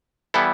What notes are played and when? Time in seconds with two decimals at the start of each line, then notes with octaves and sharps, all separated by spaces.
0.34 E3 G3 B3 E4 A4